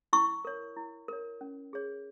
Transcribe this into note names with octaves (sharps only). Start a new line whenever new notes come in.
E4 C#6
A#4 C#5
E4
A#4 C#5
C#4
G#4 C#5